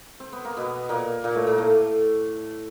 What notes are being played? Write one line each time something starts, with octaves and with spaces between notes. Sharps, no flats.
C4
B3
A#3
B2 B3
A#2 A#3
A#2 A#3
A2 A3
A#2 A#3
A2 A3